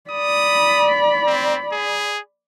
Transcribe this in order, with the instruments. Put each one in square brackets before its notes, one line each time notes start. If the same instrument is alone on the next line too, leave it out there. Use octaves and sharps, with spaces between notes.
[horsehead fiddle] D5 B5 [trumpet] D#6
[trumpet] C4
G#4